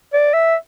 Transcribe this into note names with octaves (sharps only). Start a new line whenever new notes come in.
D5
E5